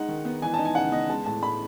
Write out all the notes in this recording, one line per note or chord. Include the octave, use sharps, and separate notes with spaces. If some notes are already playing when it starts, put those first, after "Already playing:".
Already playing: G#3 D#4 F#5
D#3
B3
E3 G#5
A5
D#4
G#5
C#3 F#5
B3 D#5
G#3 A5
A2 A5
A2 B5